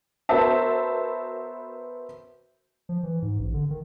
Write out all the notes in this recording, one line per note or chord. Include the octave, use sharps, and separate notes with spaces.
B3 F#4 A#4 C5 E5 A5
F3
E3
G#2
A1
D3
D#3